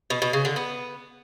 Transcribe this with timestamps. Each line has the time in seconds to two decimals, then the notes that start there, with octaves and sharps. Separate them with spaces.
0.10 B2
0.22 B2
0.33 C#3
0.45 D3
0.56 B3